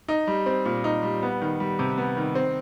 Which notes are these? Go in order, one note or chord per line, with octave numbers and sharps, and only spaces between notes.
D#4
G3
C4
A#2
D#4
G3
B3
D#3
G3
C3
B3
D#3
C4